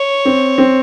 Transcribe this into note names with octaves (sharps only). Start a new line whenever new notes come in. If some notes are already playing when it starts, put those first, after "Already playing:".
Already playing: C#5
C4
C4